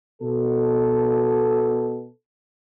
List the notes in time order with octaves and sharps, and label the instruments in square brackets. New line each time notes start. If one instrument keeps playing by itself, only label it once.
[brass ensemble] B2 A4